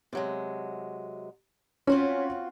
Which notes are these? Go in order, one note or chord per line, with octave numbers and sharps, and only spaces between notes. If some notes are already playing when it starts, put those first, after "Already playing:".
C3 F#3 G#3
C4 C#4 F4 F#4 C#5